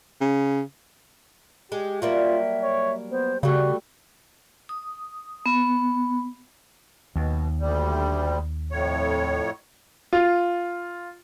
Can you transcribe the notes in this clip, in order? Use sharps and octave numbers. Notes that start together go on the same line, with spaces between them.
C#3
G#3 G4
F#3 G3 A#3 F4 E5
C#5
B3 C5
C#3 G3 A3 F#4 G4
D#6
B3
D#2 B2
D2 G3
F2 A2 C#5
F4